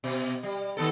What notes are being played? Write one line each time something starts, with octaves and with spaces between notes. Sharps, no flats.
B2
G3
D#3 B3 A4